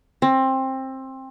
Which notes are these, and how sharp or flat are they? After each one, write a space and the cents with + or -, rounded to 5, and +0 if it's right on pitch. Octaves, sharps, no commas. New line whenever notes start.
C4 +20